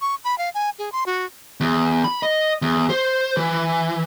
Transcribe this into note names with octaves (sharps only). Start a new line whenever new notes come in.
C#6
B5
F5
G#5
G#4
C6
F#4
E2
B5
D#5
E2
C5
E3